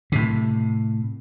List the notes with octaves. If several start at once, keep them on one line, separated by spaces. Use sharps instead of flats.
A2 C3